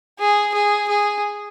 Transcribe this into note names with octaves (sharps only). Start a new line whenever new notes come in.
G#4
G#4
G#4